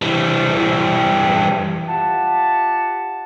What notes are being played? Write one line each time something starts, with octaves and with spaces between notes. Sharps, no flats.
E3 G3
F4 G4 E5 F#5 A5